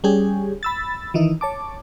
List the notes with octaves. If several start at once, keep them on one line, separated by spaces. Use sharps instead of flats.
G3 C#4 G4 G#4
B5 E6 A6
D#3 E3 D#4 E4
C#5 A5 D6